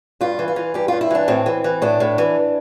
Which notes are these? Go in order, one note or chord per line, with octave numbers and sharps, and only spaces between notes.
G2 F4
E3
F4
E3
G2 G4
G2 F4
E4
E3 D4
A2 C4
E3
E3
A2 D4
A2
E3